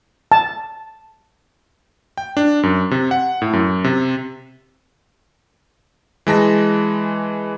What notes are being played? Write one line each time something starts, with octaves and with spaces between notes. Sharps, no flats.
A5
G5
D4
F#2
C3
F#5
A2
F#2
C3
E3 G#3 A5 A#6